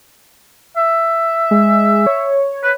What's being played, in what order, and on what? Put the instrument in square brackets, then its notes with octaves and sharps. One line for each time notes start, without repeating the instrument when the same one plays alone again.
[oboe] E5
[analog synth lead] G#3
C#5
[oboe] B4